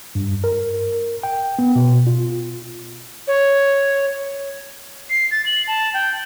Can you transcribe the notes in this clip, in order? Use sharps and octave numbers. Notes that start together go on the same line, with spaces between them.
G2
A#4
G5
B3
B2
F4
C#5
C7
A6
F#7
A5
G5